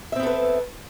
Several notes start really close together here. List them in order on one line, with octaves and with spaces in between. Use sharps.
E5 C4 B3 A4 B4